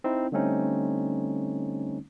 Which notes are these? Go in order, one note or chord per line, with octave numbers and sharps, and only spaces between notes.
C4 D#4 E4
D3 G3 A3 C4 C#4 D#4